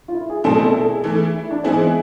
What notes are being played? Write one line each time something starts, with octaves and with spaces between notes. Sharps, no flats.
F4
E4
G#4
B2 A3 C4 E4 A4
A4
A4
G#4
E3 A3 E4
E4
D4
E3 G#3 B3 C4 E4 G#4